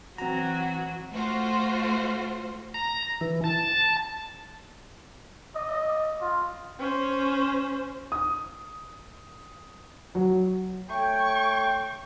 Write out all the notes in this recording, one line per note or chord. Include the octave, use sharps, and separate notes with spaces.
E3 F#3 C4 F#4 A#5
A3 F4 F#4 C5
A#5
E3
A5
D#5
F4
C#4 C5
D#6
F#3
A3 C#5 G5 C#6